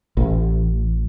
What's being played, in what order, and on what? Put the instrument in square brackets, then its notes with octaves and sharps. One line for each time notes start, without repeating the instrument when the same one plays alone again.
[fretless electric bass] A1